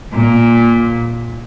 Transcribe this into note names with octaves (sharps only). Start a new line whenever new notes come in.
A#2